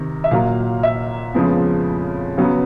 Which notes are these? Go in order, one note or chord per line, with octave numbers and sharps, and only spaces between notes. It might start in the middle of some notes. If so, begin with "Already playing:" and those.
Already playing: C3 D#3
E5
A#2 F#3 A#3 F5
E5
F2 C#3 F3 G#3 B3
C#3 F#3 B3